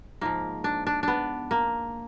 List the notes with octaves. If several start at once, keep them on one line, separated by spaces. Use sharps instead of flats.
G#2 F3 A#3
D4
D4
B3 D4
A#3